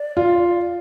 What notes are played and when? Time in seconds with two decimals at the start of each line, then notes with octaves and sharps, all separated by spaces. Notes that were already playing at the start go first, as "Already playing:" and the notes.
Already playing: D5
0.17 F4